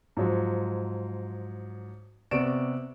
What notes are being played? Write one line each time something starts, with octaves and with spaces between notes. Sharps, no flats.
G#2 F3 F#3
C3 B3 D5 C#6 D7 E7